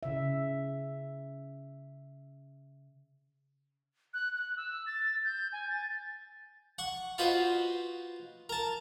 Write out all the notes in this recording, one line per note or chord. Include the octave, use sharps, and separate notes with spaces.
C#3 E5
F#6
F#6
E6
A6
G6
G#5
A6
F#5 C#6
F4 F#4 B4 C5 D#5
A#4 A5